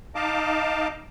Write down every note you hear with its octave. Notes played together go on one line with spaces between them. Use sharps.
D#4 D#5 F5 A5 D6